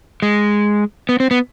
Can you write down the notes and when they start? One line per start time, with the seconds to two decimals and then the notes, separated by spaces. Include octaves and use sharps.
0.22 G#3
1.09 B3
1.20 C4
1.31 B3